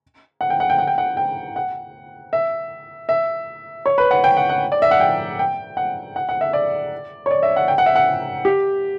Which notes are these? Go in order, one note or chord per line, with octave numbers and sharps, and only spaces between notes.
F#5
G5
F#5
G5
F#5
G5
F#5
G5
F#5
E5
E5
C#5
B4
F#5
G5
F#5
F#5
D5
E5
F#5
G5
G5
F#5
F#5
F#5
E5
D5
C#5
D5
E5
F#5
G5
F#5
E5
F#5
G4